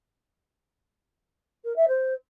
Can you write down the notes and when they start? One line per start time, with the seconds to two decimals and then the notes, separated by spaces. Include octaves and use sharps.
1.64 A#4
1.75 E5
1.87 C5